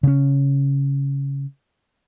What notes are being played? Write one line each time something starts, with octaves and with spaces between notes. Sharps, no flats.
C#3 C#4